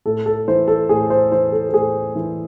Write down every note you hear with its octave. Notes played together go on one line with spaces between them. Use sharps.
A2 A4
A4
E3 C5
A4
A2 G#4
C5
E3 C5
A4
A4
A2 G#4
E3